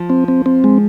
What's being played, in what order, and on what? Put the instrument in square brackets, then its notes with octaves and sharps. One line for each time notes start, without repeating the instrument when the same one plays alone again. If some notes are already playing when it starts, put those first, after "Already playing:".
Already playing: [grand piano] F3
[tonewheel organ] C4
C4
C4
G#3